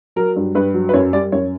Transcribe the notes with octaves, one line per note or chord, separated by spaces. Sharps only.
F#3 A#4
G2
G2 B4
F#3
B4
F#2 C#5
G3 D5
F#2 C#5